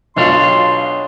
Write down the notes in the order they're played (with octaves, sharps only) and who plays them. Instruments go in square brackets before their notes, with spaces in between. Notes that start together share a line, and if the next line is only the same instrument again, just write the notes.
[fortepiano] B1 B2 F4 [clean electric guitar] D4 C#5 [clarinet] C6